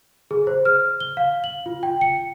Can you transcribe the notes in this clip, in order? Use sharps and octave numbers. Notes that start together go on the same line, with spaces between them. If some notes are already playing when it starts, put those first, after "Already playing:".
G#4
C5
F6
G7
F5
F#7
F4
G5
C#7